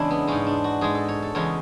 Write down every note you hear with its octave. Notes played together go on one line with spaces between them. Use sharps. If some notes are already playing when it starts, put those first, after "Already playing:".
Already playing: E2 C#3 G#3 D4 E4
B3
G#2 G#3 C#4
D4
F#4
G#2 G#3 G#4
A4
C#5
A4
E2 C#3 G#3 C#5